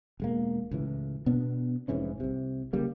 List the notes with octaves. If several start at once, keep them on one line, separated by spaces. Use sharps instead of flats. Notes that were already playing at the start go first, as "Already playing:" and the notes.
E1 G#3 A#3
C#2 A2 E3
B2 B3 D4
F1 G#2 E3 C#4
C2 C3
C#3 G3 A#3